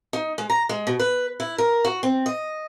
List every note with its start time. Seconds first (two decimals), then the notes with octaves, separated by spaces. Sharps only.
0.13 D#4
0.38 G#3
0.50 A#5
0.69 G#3
0.87 B2
1.00 B4
1.40 E4
1.58 A#4
1.85 F#4
2.03 C4
2.26 D#5